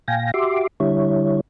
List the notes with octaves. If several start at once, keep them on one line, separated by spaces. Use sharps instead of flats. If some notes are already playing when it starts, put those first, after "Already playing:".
A#2 F5 G5 G#5 A#6
F#4 G4 E5 C6 D6
D3 G3 E4 C#5